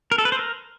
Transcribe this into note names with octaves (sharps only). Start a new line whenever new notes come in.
A#4
A4
B4
C5
A#4